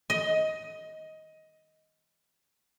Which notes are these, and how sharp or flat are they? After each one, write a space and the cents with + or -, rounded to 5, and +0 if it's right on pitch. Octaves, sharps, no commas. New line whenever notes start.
D#5 +15